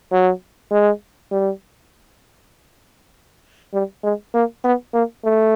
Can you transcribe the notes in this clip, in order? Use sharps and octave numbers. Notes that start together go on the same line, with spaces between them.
F#3
G#3
G3
G3
G#3
A#3
B3
A#3
A3